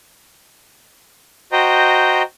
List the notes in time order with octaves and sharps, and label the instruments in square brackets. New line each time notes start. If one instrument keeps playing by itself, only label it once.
[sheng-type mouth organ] F#4 C5 D#5 G5 A#5